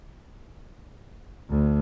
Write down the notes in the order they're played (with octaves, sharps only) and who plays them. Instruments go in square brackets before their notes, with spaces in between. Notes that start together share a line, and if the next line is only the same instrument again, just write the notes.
[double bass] D2